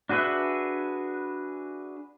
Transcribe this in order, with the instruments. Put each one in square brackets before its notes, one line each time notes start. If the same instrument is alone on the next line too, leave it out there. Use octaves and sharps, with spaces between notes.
[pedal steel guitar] D4 F#4 G#4 B4 E5